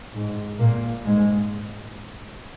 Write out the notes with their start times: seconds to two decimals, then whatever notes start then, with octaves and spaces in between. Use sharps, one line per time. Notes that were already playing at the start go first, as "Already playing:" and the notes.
0.15 G#2
0.60 A#2 A#3
1.04 G#2 G#3